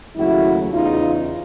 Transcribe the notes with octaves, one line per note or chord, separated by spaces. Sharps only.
D#2 C#3 F#3 A3 E4 F#4
E2 C#3 E3 D#4 F4